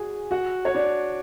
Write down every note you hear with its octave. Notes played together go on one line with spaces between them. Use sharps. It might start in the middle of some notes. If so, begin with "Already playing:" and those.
Already playing: F#4 G#4 G#5
F#4 F#5
C#5
D4 D5